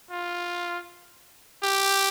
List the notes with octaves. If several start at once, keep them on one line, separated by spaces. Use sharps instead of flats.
F4
G4